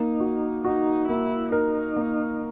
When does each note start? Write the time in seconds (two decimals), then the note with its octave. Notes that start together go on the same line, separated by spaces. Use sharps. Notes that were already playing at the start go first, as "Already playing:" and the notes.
Already playing: A#3 D#4
0.20 F#4
0.64 D#4 F#4
1.08 A#3 E4
1.52 D#4 A#4
1.96 A#3